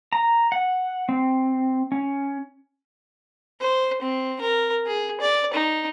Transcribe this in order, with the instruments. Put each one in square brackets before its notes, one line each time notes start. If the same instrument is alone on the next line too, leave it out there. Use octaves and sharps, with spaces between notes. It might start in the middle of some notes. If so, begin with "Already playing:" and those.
[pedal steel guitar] A#5
F#5
C4
C#4
[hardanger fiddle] C5
C4
A#4
G#4
D5
D#4